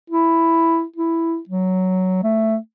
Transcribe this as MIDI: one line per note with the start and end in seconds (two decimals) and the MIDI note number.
0.10 0.84 64
0.96 1.38 64
1.49 2.18 54
2.24 2.57 57